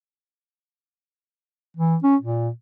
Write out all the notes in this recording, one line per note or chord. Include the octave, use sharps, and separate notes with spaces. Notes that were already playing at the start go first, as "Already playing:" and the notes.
E3
C#4
A#2